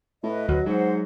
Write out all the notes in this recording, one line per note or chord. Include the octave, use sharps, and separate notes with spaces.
A2 B4 D#5
D2 F#3
G#2 F#3 C5 F#5